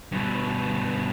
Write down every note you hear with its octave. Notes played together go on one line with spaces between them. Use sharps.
G2 B2